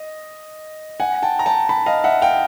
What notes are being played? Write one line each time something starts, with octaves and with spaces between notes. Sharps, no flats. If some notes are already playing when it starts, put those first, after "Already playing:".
Already playing: D#5
F#5 G#5
G5 A5
A#5
G5 A5
A5 B5
D#5 F5
E5 F#5
F5 G5